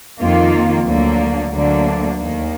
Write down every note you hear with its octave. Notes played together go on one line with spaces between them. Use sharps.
F2 D#3 A#3 F4
D2 D3 F#3 A#3
D2 D3 F#3 A#3 D4
D#2 D#3 A#3